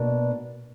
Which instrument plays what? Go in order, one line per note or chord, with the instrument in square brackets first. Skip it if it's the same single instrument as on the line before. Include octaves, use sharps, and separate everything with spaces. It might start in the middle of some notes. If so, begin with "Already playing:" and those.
Already playing: [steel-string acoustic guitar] B2 A#3 D4